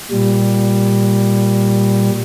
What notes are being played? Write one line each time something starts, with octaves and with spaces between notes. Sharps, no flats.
A#2 G3